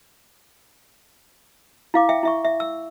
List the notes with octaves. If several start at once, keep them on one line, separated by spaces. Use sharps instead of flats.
E4 F5 D6
E5 G5
E4 E5 C#6
E5
E6